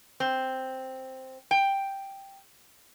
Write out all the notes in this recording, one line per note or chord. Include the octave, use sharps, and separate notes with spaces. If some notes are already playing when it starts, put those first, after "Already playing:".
C4
G5